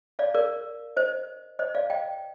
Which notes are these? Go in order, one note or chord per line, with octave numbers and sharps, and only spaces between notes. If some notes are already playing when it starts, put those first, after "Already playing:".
D5 F5
A#4 D5
C5 D#5
C5 D#5
D5 F5
D#5 G5